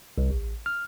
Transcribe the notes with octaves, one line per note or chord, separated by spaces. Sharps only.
C2
A1
F6